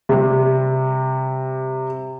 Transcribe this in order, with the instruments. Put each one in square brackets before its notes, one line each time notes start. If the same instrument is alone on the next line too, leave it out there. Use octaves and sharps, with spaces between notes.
[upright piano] C3 G3